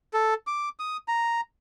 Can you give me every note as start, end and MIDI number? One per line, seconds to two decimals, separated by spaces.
0.13 0.34 69
0.47 0.69 86
0.79 0.97 87
1.08 1.41 82